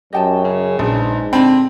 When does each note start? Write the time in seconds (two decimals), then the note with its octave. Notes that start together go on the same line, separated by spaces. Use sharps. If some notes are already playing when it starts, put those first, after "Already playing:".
0.13 F#2 G4 D#5 G5 A5
0.44 C#3
0.79 A#1 G#2 D4 B4
1.33 D3 C4 B5